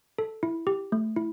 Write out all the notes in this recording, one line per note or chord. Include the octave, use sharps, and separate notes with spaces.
A4
E4
G4
A3
E4